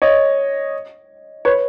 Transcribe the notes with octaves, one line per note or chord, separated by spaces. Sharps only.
C#5 D#5
B4 C#5